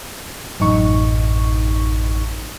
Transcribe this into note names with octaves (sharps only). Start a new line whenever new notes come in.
A1 F#2 D#4 C#6